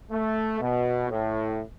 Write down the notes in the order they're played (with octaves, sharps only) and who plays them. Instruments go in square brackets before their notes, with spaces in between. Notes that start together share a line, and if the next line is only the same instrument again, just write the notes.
[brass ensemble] A3
B2
A2